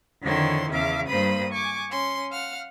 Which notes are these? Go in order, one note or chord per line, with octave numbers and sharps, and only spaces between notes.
F2 D3 D#3 E4 C#5 C6
E2 C#3 E5 F5 D6
G2 A#3 C5 B5 D#6
G#5 C#6 D6
C#4 C6
F5 F#5 F6